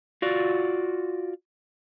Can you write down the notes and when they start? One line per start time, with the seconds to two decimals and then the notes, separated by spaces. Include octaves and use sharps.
0.22 F4 F#4 D5